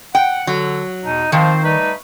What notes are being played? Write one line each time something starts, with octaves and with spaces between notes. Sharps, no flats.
F#5 G5
D3 F#3
E2 B2 D#4
D#3 F3 C4 F4 C5
G3 A3 D#4 B4